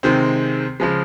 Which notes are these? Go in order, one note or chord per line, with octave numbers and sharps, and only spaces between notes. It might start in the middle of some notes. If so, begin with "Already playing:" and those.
C3 D#3 G#3 C4
C#3 F3 G#3